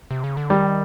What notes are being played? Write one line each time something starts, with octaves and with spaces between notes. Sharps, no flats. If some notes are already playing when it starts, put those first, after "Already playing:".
C3
C#3
D3
D#3 G3